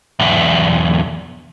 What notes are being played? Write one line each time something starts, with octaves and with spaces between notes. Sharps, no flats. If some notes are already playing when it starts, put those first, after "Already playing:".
B1 E2